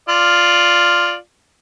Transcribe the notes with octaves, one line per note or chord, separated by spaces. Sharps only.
F4 D5